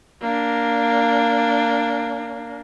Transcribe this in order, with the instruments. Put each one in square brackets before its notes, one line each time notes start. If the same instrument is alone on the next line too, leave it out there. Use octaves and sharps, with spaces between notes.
[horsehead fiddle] A#3 D4